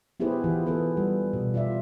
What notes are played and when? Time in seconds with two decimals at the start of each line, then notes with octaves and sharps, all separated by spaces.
0.20 B3 E4 G4 G#4 B4 C5
0.44 E3 F4 G4
0.66 B3 G#4 A4 B4
0.97 G3
1.33 B2
1.54 F4 D5 E5